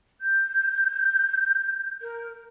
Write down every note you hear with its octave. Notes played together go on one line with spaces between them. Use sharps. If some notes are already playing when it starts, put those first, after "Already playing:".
G6
A#4